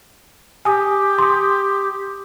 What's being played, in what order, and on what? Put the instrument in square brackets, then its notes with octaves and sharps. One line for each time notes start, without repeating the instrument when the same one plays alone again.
[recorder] G4 [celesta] G#5 D#6
[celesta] C6 D#6